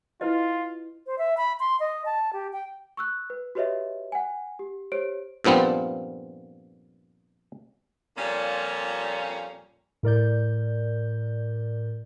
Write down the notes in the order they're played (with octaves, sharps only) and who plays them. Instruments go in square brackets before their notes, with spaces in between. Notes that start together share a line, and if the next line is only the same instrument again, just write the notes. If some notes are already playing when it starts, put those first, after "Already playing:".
[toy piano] E4 B4 D#5 [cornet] F4
[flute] C5
E5
B5
C6
D#5
A5
G4
G5
[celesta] C#6 E6 F#6
B4
F#4 G4 B4 C#5 D#5 E5
F#5 G#5
G4
G4 C5 C#5 D7
[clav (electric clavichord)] G2 A#2 F3 B3 C4
[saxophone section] F2 A#2 G3 A#3 C#4
[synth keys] A2 A#4 D5 G6